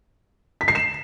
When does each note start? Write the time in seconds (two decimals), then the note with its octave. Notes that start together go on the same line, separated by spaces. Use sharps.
0.61 B6
0.68 C7
0.75 E7